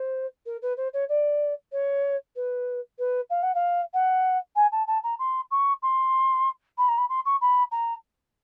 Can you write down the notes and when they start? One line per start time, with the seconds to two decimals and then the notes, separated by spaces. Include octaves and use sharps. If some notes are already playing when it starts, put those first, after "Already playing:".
Already playing: C5
0.46 A#4
0.62 B4
0.77 C5
0.93 C#5
1.09 D5
1.72 C#5
2.36 B4
2.98 B4
3.30 F5
3.42 F#5
3.54 F5
3.93 F#5
4.55 G#5
4.72 A5
4.87 A5
5.03 A#5
5.19 C6
5.51 C#6
5.82 C6
6.78 B5
6.88 A#5
6.98 B5
7.09 C6
7.25 C#6
7.41 B5
7.71 A#5